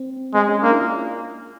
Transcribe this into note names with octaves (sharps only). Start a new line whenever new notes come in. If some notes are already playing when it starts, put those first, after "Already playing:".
Already playing: C4
G#3 C4
C#4
A#3 D4
E4
F4